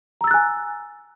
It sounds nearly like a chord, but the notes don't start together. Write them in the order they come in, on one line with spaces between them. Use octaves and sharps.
A#5 E6 A6 F#6 G#5